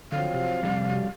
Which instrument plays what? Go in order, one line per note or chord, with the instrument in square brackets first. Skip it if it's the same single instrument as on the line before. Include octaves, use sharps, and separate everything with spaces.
[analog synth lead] D3 [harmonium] F3 F#3 C4 [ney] F5
[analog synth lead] C3
[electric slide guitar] F2 G3
[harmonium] F#3